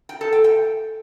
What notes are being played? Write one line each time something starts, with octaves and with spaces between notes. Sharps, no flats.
G5
A4
G5
G5